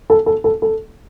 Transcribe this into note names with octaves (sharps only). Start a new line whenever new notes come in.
A4
A4
A4
A4